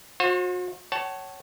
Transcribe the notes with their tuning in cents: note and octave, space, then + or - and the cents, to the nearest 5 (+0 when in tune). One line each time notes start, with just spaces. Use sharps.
F#4 -40 C5 +40
C#5 +0 F#5 +45 A5 -5